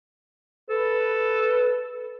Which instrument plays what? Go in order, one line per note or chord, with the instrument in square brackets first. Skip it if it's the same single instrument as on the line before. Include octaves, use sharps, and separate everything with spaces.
[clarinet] A4 [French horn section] B4